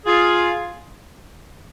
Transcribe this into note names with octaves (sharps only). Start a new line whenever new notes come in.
F4 G#4